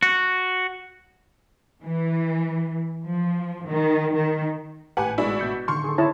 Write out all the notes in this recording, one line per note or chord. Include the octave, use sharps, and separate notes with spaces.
F#4
E3
F3
D#3
D#3
G#1 A2 G4 B4 F#5 G#5
B2 G#3 D4 E4 F#4
B2 G6 C#7
A2 D3 D#3 C6 C#6 F6
G#4 A4
E4 C#5 A5